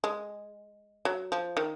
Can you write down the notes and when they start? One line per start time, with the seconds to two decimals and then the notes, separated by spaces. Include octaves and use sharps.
0.04 G#3
1.05 F#3
1.32 F3
1.57 D#3